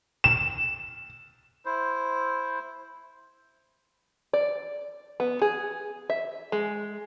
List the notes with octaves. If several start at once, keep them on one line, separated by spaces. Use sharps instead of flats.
E7
E4 C5
D5
B3
G#4
E5
G#3